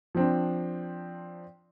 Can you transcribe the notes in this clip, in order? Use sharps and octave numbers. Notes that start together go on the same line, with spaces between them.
F3 C4 D4